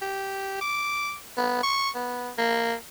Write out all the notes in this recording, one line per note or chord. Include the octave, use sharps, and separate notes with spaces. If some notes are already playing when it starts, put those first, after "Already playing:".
G4
D6
B3
C#6
B3
A#3